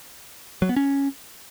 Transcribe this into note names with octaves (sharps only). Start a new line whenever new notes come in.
F#3
B3
C#4